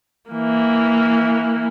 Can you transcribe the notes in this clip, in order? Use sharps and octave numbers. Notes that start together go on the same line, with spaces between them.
E3 A#3